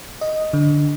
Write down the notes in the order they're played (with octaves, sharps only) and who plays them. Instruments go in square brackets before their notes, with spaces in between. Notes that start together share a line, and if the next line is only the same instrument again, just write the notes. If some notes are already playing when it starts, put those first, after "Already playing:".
[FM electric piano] D#5
D3